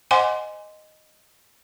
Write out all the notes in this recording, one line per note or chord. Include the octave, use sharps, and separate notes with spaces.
C5 D#5 F#5 G#5 C6 D6